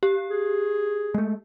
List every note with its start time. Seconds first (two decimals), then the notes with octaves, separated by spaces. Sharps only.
0.03 G4
0.30 G#4
1.14 G#3 A3